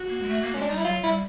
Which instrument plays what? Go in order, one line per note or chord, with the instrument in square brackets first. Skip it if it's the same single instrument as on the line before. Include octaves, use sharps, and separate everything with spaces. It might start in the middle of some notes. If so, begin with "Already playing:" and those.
Already playing: [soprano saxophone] F#4
[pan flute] A#3
G#3
A3
A#3
[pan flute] G#3 [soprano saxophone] C#4
[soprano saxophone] D4
[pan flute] G3 [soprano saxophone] D#4
[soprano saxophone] E4
[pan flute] F#3 [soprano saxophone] F4
[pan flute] G3 [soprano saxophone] E4